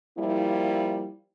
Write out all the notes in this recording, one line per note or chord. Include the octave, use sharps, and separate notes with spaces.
F3 G3 A#3 E4